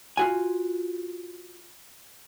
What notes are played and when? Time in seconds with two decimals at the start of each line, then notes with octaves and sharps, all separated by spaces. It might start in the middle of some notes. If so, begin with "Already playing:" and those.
0.17 F4 F#4 G#5